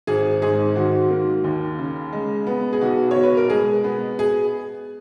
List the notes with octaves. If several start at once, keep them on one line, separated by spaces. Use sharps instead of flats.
G#1 G#4
G#2 G#4
D#3 F#4
A#3
D#2
C#3
G#3
B3
G#4
B1 F#4
C#5
B2
B4
A#4
G#3 G#4
B3
G#4